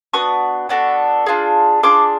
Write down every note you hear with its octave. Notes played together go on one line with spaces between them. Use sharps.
B3 D4 F#4 C#6 D#6
B3 D4 F#4 A4
D4 F4 G#4
D4 F4 G#4 C6 D6